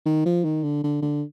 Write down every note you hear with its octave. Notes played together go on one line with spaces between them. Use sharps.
D#3
F3
D#3
D3
D3
D3